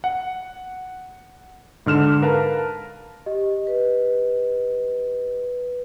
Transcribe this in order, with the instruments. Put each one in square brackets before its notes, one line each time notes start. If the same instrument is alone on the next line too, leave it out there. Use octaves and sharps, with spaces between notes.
[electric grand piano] F#5
G#2 D3 F6 E7
A#4 B4 F5 A5 A#5
[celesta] G4 D#5
[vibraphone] B4